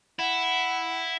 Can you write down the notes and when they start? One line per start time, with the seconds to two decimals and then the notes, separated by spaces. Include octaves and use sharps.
0.19 E4 F#5